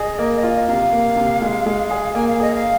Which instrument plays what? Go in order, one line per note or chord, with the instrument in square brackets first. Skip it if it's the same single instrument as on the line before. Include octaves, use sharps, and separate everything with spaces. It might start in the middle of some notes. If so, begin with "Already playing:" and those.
Already playing: [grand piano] G#4 [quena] D#5
[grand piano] A#3
F4
[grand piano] C3 [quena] F5
[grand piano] A#3
C3
G#3
G#3
G#4
[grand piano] A#3 [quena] G#5
[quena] F5
[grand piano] G#4 [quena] D#5
[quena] F5